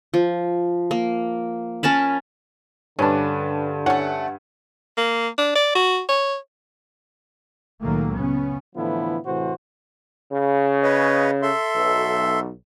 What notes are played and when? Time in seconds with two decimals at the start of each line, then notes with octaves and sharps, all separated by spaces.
0.14 F3
0.91 A#3
1.83 C#4 A#4 A5 B5
2.99 G2 D3 C#4 D4 B4 A5
3.86 A3 C#4 F#5
4.97 A#3
5.38 D4
5.55 D5
5.75 F#4
6.09 C#5
7.82 C#2 A#2 D#3 F#3 A3 A#3
8.16 C#3 B3 C#4
8.76 A2 D3 E3 F3 B3 E4
9.25 A2 C3 E3 F#4 C5
10.31 C#3
10.83 B4 C#5 D#5
11.42 A4 E5 C6
11.74 B1